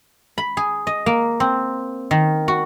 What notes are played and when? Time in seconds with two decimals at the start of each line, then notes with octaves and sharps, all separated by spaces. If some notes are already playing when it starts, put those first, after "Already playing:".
0.38 B5
0.57 G#4
0.87 D#5
1.06 A#3
1.40 C4
2.11 D#3
2.48 F#4